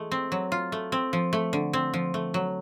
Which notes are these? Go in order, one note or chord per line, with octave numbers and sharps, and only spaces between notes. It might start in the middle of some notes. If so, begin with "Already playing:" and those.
Already playing: E3 G#3 A3
C4
F#3
F4
A3
C4
F3
A3
D3
C4
F3
A3
F#3